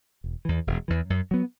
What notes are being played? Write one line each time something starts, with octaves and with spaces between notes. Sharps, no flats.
E1
E2 E3
E1
E2 E3
F#2
F#3 B3